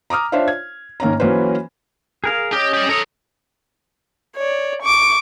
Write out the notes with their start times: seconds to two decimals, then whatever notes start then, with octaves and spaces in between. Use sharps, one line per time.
0.10 A#5 D6 D#6 F6
0.32 D4 F4 C5 C#5 E5 F5
0.48 G#6
1.00 G#1 A#3 C#4 A#5
1.20 E3 F#3 A#3 C#4 B4 C5
2.24 G#4 A#4 F5
2.53 C#4 G4 D#5
2.73 G4 D5
2.89 A4 A#4 C#5 D#6
4.36 C#5 D5
4.82 C#6 D6